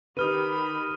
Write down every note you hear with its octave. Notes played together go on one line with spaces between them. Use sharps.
D#3 G4 B4 B5 D#6 F6 D#7